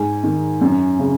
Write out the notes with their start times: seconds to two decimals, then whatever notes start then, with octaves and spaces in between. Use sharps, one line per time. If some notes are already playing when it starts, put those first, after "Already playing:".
Already playing: G#2 G#5
0.24 D#3
0.61 F#2
0.99 C#3